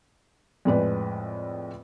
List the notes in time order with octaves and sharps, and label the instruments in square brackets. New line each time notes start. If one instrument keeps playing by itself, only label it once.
[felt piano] F2 A2 G#3 B4 D5